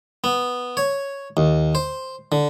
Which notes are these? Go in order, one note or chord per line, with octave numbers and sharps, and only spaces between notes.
B3
C#5
D#2
C5
D3